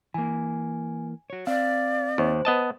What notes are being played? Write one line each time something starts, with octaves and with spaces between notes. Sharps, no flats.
E3 A#3 G#5
F#4 C#5
C4 D5 F5
D#2 C5
B3 D#5 A5